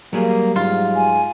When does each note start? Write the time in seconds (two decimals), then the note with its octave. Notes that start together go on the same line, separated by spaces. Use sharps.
0.13 F#3 G3 A#3 G#4
0.56 G#2 F4
0.95 G#5